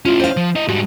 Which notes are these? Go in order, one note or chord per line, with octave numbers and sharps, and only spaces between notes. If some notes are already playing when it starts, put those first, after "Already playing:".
C#4 E4 F4
C5 F5
F3
E4 D#5
G#2 G3 F#4